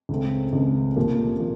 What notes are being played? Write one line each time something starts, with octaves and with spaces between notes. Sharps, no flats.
C#2 C#3 A3 C4
C#2 C#3 A3 C4
C2 A#2 F3 A#3
A#2 F3 A#3